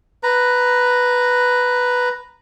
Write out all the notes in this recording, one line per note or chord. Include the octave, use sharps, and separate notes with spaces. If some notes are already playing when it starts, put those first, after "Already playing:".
B4 A#5